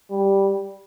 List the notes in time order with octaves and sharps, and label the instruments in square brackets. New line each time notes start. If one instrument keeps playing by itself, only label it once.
[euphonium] G3